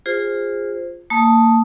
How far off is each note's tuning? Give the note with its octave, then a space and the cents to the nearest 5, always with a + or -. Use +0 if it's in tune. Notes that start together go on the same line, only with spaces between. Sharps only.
F4 +0 G#4 -25 C5 +0
A#3 -30 A5 +0 D#6 +0